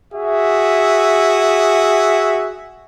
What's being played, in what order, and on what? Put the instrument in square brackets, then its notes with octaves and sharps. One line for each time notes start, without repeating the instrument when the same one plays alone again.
[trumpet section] F#4 G#4 E5